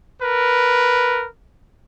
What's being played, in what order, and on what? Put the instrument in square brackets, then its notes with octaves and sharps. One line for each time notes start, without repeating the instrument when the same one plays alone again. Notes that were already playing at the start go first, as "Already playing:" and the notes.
[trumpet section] A#4 B4